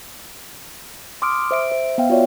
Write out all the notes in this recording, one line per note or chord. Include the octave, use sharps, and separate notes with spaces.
C6 D6 D#6 F6 D7
C5 E5 D7
C5 E5
B3 F5 G5
F4 F#4 C#5 D5 E5